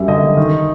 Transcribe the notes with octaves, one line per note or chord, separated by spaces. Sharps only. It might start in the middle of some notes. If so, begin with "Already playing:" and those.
Already playing: F#2 G3 E5
D3 D#5
F#1
D#3